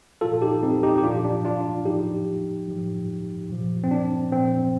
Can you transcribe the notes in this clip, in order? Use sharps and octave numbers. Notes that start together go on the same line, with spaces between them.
A#2 F3 F4 A4
D#4 G4
C4 D#4
D#4 G4
G4
A#2 F3 D4 F4
D4
D4 F4
A2 F3 D#4 G4
A2 F3
A#2 F3
C4
D4
A#2 F3 C4